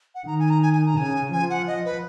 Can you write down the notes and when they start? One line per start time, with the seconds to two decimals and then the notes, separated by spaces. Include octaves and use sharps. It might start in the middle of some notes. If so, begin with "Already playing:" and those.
0.15 F#5
0.27 D#3 A#5
0.39 G#5
0.50 A#5
0.63 G#5
0.73 G#5
0.86 A#5
0.97 C#3 G#5
1.32 F3 G#5
1.50 F#5
1.67 D#5
1.85 B4